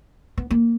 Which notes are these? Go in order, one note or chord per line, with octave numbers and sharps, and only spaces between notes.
B3
A#3